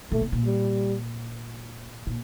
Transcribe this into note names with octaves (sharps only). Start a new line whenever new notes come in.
A#2 A3
C3
A#2
G3
A#2